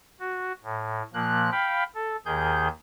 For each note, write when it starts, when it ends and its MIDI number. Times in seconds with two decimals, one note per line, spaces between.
0.19 0.52 66
0.63 1.02 45
1.14 1.50 46
1.14 1.50 53
1.14 1.50 58
1.14 1.50 90
1.52 1.84 77
1.52 1.84 79
1.52 1.84 83
1.95 2.17 69
2.26 2.68 39
2.26 2.68 51
2.26 2.68 68
2.26 2.68 91